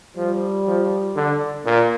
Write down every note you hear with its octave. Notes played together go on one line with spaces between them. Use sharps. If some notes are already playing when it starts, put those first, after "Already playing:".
F3 G3
F3
D3
A#2 A#3